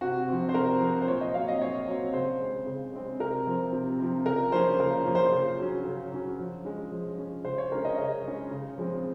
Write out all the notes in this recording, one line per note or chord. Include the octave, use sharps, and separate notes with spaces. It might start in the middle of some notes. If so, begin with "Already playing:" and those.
C3 F#4
F3 C4
C5
C3 A#4
F3 C4
C5
A#2 C#5
D#5
F#3 C4 F5
D#5
A#2 C#5
F#3 C4
C#3 C5
G#3 C4
C#3
G#3 C4
C3 A#4
F3 C4
C3
F3 C4
C#3 A#4
F3 A#3 C#4 C5
C#3 A#4
F3 A#3 C#4
C5
C#3
F#3 C#4
C#3
F#3 C#4
F3
G#3 C#4
F3
G#3 C#4
C#3 C5
C#5
G#3 C#4 A#4
D#5
C#3 D#5
G#3 C#4
C#3
F3 G#3 C4